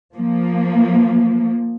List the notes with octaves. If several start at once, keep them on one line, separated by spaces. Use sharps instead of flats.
F3 A#3